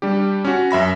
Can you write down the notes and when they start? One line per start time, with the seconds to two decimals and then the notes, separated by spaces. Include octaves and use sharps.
0.02 G3 D4 G4
0.45 C#4 F#4
0.71 F#2 E5 B5 A#6